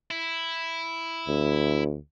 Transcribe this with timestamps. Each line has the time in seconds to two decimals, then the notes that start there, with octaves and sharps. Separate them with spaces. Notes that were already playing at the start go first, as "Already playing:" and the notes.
0.11 E4
1.28 D2